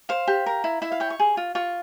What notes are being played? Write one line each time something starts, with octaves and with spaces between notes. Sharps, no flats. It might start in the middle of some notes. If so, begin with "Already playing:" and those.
C5 F5
G4
A#4
E4
E4 E5
F5
C#5 G5
C#6
G#4
F4
F4 C#6